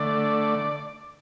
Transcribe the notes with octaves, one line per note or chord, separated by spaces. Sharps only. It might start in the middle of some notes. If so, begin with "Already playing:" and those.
Already playing: D3 A3 D5